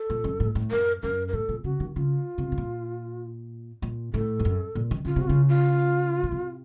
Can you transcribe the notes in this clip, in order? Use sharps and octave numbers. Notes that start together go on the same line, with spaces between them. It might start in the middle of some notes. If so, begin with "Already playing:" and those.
Already playing: A4
A#2
F#2
A2
A2
F#2 A#4
F#2 A#4
A#4
A2 A4
A#2
C#3 F#4
D#3
C#3 F4
C3
C3
A#2
A#2
A2 A4
F2
F#2
A#2
D#3
C#3 F4
C3
F#4
C#3 F4
F4
A#2
C3